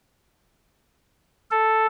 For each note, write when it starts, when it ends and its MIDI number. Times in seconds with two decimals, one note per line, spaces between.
1.51 1.87 69